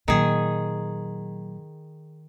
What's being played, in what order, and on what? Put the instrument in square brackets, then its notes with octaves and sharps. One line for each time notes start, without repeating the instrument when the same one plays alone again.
[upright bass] A#2 F#3 [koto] D#3 G#4